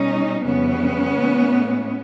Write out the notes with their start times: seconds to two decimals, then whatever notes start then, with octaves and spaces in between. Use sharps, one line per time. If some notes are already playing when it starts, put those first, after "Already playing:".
Already playing: B2 G3 C#4 D#4
0.44 F2 C#3 E3 G3 B3 C#4
1.15 A2 E3 G#3